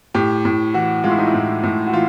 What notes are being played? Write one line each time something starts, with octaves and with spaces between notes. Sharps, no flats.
A2 G4
A2
E3 F#4
G#3 F4
E4
D#4
E4
A2
A2
F#4
E3 F4